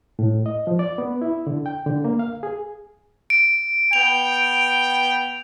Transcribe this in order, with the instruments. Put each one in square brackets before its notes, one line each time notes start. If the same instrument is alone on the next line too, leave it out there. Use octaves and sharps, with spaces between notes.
[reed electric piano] A2
D#5
F3
D5
B3
E4
D3
G5
D3
A#3
F5
G#4
[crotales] D7
[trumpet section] B3 G5 [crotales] F7